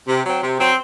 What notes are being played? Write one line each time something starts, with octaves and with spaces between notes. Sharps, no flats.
C3
F#3 C4
C3
F#3 C4